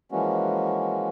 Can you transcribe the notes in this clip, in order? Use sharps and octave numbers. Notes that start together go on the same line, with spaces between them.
E3 F3 G#3 A#3 C#4 F#4